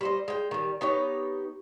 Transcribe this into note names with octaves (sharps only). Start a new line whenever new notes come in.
G3 C5 D#5
G#3 G5
D#3 G3
B3 D#4 G4 C#5